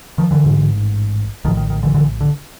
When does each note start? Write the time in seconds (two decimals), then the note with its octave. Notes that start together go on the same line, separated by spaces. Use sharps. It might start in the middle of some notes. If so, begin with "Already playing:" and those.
0.18 D#3 F3
0.31 D3 E3
0.44 A1 G#2
1.44 A#1 D#3 F3
1.48 A2
1.57 D#3
1.70 D#3
1.83 D3 E3
1.94 D3 E3
2.21 D3